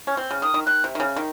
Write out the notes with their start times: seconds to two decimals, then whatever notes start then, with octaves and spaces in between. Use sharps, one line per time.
0.07 C#4
0.17 C4
0.31 C#3
0.42 D#3 D#6
0.54 D#3
0.66 D#3 F#6
0.84 C3
0.95 D#3
1.00 C#3
1.16 D#3